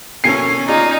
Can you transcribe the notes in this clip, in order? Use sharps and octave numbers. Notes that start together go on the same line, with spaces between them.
B2 A#3 C#4 A4 G#5 C7
D#4 F4 G#4 D5